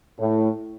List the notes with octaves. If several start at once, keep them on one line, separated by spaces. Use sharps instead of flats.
A2